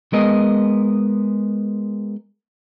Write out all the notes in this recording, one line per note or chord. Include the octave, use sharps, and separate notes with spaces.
G#3 B3 A#4 D#5